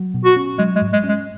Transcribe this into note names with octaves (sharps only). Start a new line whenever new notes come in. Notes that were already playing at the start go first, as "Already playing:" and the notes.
Already playing: F#3
B2
F#4
C#4
F#3 G#3
G#3
G#2
G#3
C#4
G#3